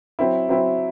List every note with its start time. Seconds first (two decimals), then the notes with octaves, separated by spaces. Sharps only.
0.19 F#3 C4 E4
0.49 F#3 C4 E4